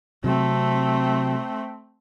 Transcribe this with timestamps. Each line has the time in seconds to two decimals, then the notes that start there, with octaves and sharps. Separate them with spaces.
0.24 C3 F#3 A3 C4